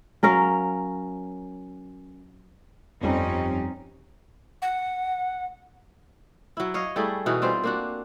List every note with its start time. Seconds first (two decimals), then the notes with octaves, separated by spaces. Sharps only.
0.23 F#3 C#4 A#4 F5
3.01 G1 F2 G3 C4 C#4 D#4
4.62 F#5
6.57 F#3 E4
6.74 C#5 D#5 F5
6.96 G3 A3 E4 G#4
7.26 B2 E3 D#4 F#4
7.42 G3 C4 F4 C5
7.64 A#3 D4 F#4